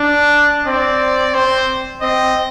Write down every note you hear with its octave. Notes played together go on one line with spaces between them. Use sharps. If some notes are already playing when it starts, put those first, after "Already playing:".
Already playing: D4
C4 D5
C4 C5
C4 D#5